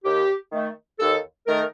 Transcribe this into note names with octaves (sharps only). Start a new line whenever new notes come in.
D#2 G4
D#3 A3
D#2 A4
D#3 A3 A#4